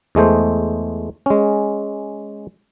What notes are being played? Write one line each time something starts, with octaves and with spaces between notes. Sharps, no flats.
E2 G#3 A3 C5
G#3 C#4